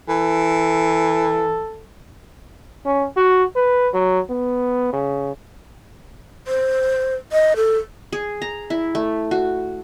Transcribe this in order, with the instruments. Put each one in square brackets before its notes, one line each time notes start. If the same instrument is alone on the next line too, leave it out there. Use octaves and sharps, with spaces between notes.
[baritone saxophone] E3 [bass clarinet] A4
[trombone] C#4
F#4
B4
F#3
B3
C#3
[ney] C5
D#5
A4
[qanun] G#4
A#5
E4
A3
F#4